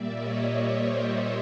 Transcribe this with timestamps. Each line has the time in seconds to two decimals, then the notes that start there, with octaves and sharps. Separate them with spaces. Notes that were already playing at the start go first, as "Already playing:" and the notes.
Already playing: A#2 G3 A#3 D5 E5
0.15 C#5 D#5
0.43 C#5 D#5
0.72 C5 D5